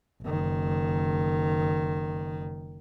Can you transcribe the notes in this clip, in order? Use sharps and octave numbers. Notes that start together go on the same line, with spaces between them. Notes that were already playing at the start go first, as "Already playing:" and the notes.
F#1 D#3